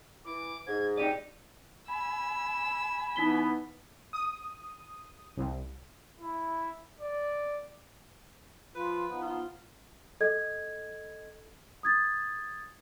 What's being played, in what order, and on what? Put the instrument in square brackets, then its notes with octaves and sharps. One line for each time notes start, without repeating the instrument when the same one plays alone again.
[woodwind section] E3 [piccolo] D6
[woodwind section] G#2 [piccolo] G#6
[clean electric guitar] D#4 G4 D5 [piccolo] D#7
[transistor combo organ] G#5 B5 [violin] E6
[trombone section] E3 B3 [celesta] D#4 B6 G7
[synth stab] D#6
C2
[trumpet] E4
D5
[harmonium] F3 F4 [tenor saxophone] B4
[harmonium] F3 B3 D#4
[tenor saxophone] F4
[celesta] A4 D#5 G#6
D#6 G#6 A6